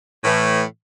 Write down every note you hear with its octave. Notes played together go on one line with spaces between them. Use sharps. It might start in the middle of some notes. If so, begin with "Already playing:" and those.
A2 E3